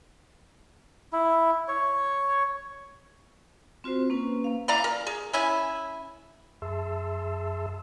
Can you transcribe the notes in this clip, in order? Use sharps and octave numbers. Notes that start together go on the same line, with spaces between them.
E4
C#5
C4 F4 F#4 C5
A#3 C#4 B4
A#3 F5
E3 D5 F5 A#5
A#4
G#4
C#4 E4 G#5
F#2 G#4 E5 A5 C6 E6